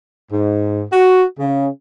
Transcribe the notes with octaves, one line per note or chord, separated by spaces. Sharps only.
G#2
F#4
C#3